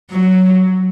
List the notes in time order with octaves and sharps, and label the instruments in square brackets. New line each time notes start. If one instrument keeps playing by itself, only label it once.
[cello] F#3